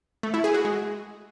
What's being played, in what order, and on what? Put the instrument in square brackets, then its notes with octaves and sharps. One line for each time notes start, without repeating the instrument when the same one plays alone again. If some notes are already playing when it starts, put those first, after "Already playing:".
[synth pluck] A3
E4
G#4
F#4
G#3